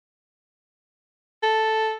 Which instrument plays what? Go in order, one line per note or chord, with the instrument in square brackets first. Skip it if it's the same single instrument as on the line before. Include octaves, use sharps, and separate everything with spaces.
[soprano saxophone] A4